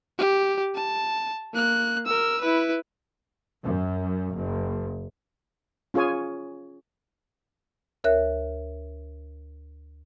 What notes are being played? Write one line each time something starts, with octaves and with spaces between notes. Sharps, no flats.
G4
A5
A#3 F#6
A#4 E6
E4 B4
F#2
F#1
C#4 F4 G#4 C#5 G#5
D2 A#4 C#5 E5 F#6